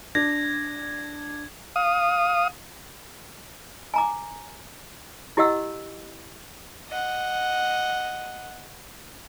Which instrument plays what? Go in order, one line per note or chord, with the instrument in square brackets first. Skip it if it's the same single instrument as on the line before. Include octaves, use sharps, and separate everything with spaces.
[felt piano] D4 [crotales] G#6 [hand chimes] A#6
[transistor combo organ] F5 D#6
[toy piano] G#5 A#5 D6
E4 G4 D#5 F#5 E6
[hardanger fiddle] D#5 F#5